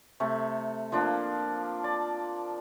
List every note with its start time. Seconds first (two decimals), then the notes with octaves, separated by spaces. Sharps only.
0.20 C3 A3
0.92 F3 A#3 D4
1.84 D5